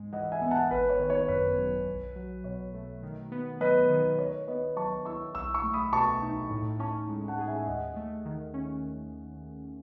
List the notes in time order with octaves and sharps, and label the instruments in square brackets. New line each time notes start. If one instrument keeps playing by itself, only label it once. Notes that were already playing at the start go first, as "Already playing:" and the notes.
Already playing: [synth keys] G#2 G#3
[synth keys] E3 [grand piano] D#5 F#5
[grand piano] E5 G#5
[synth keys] B3
[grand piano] F#5 A5
[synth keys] G#1 [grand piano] B4
[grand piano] C#5
[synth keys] D#3
[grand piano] C#5
[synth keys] F#2 [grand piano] B4
[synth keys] F#3
B1
F#3
[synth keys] B2 [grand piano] C#5
[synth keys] A3
D#3
B3
[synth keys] F#3 [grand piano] B4 D#5
[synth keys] D#3
[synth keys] D#3 [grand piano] C#5
[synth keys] B3 [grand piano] B4 D#5
[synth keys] F#3 [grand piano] A5 C#6
[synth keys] E4 [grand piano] C#6 E6
[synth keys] B1 [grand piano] C#6 E6
[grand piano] C#6 E6
[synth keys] A3
[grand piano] B5 D#6
[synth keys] B2 [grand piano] A5 C#6
[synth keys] D#4
A2
[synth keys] C#4 [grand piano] A5 C#6
[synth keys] G#3
[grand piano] F#5 A5
[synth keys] G#4
[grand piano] E5 G#5
[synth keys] D#2 [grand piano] D#5 F#5
[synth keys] A3
D#3
C#4